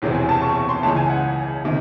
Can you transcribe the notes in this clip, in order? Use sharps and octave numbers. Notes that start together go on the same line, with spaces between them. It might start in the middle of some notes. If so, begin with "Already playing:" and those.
E1 E2 C3 E3 C4
G#5
A5
C#6
C#6
C6
C#2 C#3 E3 A5
G#5
F#5
C3 D#3